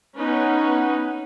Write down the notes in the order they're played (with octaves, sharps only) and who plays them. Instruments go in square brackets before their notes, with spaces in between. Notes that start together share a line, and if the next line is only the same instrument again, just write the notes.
[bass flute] B3 [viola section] C#4 D#4 B4